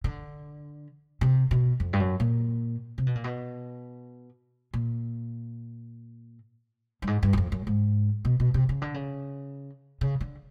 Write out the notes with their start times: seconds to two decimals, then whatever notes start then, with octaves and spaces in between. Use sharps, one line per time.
0.04 D3
1.21 C3
1.51 B2
1.80 F2
1.93 G2
2.00 F#2
2.20 A#2
2.98 C3
3.06 B2
3.15 A#2
3.24 B2
4.73 A#2
7.02 G2
7.07 G#2
7.23 G2
7.33 F#2
7.38 F2
7.52 F#2
7.67 G#2
8.25 B2
8.40 B2
8.54 C3
8.69 C#3
8.82 D3
8.94 C#3
10.01 C#3
10.21 D3